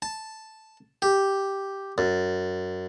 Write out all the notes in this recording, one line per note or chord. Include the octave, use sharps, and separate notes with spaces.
A5
G4
F#2